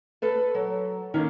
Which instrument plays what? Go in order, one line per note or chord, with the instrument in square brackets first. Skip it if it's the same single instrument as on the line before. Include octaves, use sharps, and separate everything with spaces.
[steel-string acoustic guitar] A4 B4 A5
F#3
[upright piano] D#3 A#3 [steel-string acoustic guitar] C#4